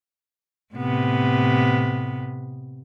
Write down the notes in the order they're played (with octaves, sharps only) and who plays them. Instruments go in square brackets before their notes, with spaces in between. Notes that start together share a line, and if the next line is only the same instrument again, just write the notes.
[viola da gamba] A2 C3 B3